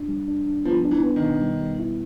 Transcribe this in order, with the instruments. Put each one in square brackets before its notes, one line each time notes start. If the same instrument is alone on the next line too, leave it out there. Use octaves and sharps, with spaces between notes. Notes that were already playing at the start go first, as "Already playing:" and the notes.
Already playing: [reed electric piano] D4
G3
D4
D4
[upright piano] F3 [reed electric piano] B3
[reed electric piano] D4
[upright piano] E3
[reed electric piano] B3
[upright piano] D#3
[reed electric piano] B2
G3
G3
E4